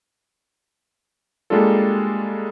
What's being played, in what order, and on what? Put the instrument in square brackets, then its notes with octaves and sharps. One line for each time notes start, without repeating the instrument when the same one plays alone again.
[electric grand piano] G3 G#3 A#3 D4 F4 A4